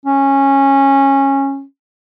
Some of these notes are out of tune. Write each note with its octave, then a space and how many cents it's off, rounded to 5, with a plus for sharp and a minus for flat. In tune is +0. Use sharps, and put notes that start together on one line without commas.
C#4 -15